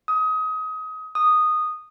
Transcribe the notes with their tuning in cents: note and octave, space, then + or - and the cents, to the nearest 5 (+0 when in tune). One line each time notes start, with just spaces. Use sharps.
D#6 +25
D#6 -10